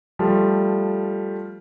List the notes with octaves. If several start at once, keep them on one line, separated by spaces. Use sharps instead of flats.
F3 G3 A3